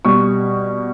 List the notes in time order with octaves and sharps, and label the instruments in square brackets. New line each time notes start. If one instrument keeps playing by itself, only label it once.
[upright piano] B2 G3 C#6